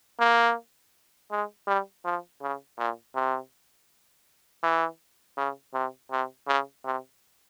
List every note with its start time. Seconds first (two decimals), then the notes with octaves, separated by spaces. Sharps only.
0.20 A#3
1.31 G#3
1.67 G3
2.05 F3
2.42 C#3
2.78 A#2
3.15 C3
4.63 E3
5.38 C#3
5.74 C3
6.11 C3
6.48 C#3
6.85 C3